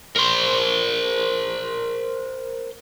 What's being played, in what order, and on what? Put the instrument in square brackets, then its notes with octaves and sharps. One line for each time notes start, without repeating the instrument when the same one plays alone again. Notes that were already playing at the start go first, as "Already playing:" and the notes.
[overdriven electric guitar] A#4 C5